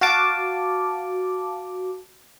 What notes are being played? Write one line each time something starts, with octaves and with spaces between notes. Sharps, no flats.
F#4 F5 A5 D6